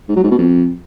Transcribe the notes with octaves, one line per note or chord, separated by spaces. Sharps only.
G#2
F#3
G#2
B2
F2